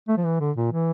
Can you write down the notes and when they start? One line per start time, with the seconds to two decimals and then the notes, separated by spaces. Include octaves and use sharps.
0.08 A3
0.17 F3
0.24 E3
0.40 D3
0.57 A#2
0.73 E3